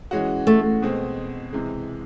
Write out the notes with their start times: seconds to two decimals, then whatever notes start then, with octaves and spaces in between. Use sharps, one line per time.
0.11 E3 G#3 C#4 F#4
0.47 A3
0.82 B2 G#3 C4
1.53 C3 E3 G#3